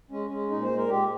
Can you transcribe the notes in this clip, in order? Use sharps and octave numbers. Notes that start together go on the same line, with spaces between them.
G#3 C#4
G#3 C#4
A#2 D#4
C5
G#3
A#4
G#3 G4